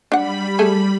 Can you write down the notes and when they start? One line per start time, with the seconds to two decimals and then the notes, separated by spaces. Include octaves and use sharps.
0.12 G3 D4 F#5 B5
0.59 A3 G#4 A4